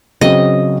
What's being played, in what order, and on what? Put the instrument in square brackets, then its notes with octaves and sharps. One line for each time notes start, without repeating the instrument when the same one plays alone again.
[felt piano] C#3 F#3 C4 [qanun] D#5